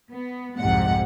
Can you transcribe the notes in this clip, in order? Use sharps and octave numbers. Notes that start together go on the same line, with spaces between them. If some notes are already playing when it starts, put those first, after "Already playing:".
B3
C2 F2 G#2 C3 F#5